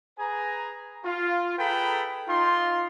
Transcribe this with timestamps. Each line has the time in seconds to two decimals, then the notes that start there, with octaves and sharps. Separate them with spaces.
0.19 G#4 B4 G#5 A#5
1.05 F4
1.58 G#4 A4 B4 G5 A#5 B5
2.28 D#4 F4 C6